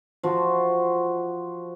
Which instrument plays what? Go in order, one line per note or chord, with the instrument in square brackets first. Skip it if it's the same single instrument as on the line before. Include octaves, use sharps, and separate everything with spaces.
[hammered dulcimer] F3 F#4